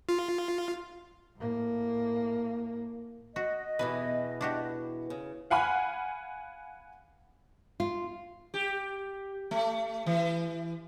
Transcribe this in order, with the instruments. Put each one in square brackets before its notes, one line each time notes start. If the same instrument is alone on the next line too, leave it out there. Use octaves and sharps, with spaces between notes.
[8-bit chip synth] F4
[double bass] A2 A#3
[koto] F#4 [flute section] D#5
[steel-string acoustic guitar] E2 B2 E3 [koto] B4
[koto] D4 F#4 G4
[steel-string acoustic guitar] C#3
[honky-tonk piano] F5 F#5 G#5 B5 F6
[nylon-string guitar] F4
[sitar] G4
A3
E3